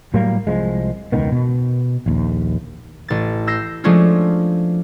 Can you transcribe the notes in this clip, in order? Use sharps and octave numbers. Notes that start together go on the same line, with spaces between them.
A2 F#3 G3 A#3
C2 F3 G#3
E1 C#2 D#3 B3
B2
A#1 D#2
A1 A6
E6 G6 A#6 C7
F3 G#3 A3 C#4 D4 F4